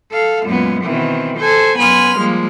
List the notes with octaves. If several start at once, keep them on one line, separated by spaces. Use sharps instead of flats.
A4 F5
F#2 A#2 G#3 B3
B2 D#3 E3 C4
A4 C5 G#5
F#2 B3 G#5 B5 C6 F6
F3 G3 G#3 A#3